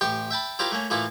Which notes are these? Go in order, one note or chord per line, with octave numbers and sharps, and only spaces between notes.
A1 G4 G5 C6 C#6
E5 G5 A5 B5
E4 F4 G4 A#4 C5 D5
A3 A#3 C#4
A2 E3 A#3 E4 F4 A4